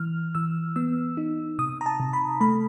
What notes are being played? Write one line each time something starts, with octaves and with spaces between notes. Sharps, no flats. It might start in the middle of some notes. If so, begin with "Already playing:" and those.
Already playing: E3 F6
E3 E6
B3 E6
D#4
C3 D#6
A#5
A5
C3
B5
A3 B5